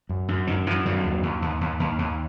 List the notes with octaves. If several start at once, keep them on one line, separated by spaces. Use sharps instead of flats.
F#2
F#2
F#2 D#3
F#2 E3
F#2 D#3 F#3
D#2
D#2
D#2
D#2
D#2
D#2